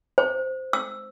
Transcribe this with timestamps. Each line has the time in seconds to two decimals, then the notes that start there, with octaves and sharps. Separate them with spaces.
0.18 C5
0.73 E6